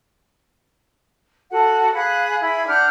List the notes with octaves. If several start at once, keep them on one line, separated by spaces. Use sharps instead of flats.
F#4 A4 F#5
G#4 F5 B5 F#6
E4 G#4 B5
D4 F#5 F6 G6